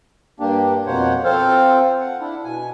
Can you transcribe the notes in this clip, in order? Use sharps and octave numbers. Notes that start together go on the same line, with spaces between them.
G2 A#3 D4 G4
F2 B2 A#3 C5 C#5 F#5
C4 F4 A4 C5 F5
F#5
D4 E4
B2 G#5